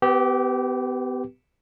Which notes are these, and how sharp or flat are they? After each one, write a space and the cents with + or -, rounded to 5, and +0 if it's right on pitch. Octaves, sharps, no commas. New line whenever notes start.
B3 +35 G4 -15 B4 -20